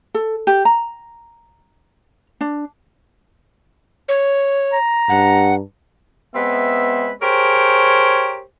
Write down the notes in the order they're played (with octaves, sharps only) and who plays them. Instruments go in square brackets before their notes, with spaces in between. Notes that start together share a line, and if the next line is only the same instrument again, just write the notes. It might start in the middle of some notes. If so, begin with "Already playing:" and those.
[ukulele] A4
G4
A#5
D4
[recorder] C#5
[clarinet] A#5
[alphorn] G2 [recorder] F#5
[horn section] G#3 B3 C4 B4 E5
G4 G#4 A#4 C5 C#5